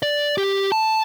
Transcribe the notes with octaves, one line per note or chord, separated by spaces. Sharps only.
D5
G4
A5